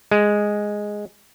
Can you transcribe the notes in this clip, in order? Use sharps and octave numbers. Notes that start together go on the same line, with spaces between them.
G#3